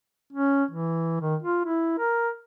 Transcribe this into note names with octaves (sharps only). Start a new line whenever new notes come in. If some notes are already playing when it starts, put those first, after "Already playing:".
C#4
E3
D#3
F4
E4
A#4